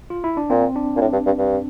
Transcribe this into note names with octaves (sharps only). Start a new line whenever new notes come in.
F4
E4
D4
A#2 C4
D4
A#2
A2
G2
G2
G2